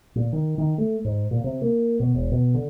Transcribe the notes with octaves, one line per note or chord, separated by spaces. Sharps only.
A#2
D#3
D#3
A3
G#2
A#2
C3
A#3
B2
E1
B2
D3